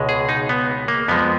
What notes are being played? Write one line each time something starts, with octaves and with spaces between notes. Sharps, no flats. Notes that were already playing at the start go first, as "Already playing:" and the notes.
Already playing: C#2 B2 G#3
G#4
D#4
B3
A#3
F2 F3 G#3 B3